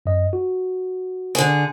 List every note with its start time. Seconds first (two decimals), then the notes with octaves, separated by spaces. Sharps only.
0.06 F#2 D#5
0.33 F#4
1.35 D3 G#4